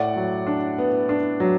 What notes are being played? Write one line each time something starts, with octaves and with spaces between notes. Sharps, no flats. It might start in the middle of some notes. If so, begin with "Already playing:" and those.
Already playing: A2 D5 F#5
F#3
D4
B3
D4
F#3